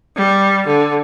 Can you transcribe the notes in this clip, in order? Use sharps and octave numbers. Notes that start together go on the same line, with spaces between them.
G3
D3